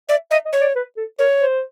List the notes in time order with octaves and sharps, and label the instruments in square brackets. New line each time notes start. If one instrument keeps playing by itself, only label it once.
[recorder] D5 [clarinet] E5
[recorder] D#5 [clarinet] E5
[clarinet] D#5
[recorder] C#5
[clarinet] D5
B4
A4
[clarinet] A#4 [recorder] C#5
[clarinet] C5